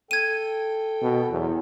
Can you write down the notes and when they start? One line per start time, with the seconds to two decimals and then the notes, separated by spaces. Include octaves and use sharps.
0.11 A4 G5 G#6 D#7
1.02 B2
1.30 E2 F#3